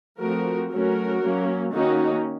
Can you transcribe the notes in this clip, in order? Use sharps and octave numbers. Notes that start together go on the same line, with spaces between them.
F3 A3 C4 F#4 A#4
F#3 A3 C#4 F#4 A#4
F#3 A#3 C#4
D#3 A#3 C#4 D#4 F#4